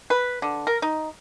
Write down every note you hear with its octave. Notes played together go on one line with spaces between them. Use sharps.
B4
D3
A#4
D#4